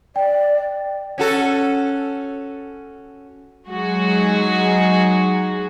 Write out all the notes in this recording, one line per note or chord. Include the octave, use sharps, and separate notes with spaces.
D5 G5
C#4 F#4 A4
F#3 G#3 D#4 F#4 G#4